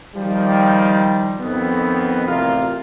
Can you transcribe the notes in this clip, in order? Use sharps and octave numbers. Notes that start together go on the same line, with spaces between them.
D#3 F3 G3
F2 D#3 B3
A1 C3 F4 A#4